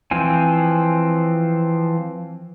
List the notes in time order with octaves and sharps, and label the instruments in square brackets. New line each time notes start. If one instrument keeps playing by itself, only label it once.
[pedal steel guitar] E3 F3 C4 G#5